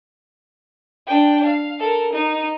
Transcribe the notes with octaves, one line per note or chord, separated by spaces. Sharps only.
D4 G5
F5
A4 A#4
D#4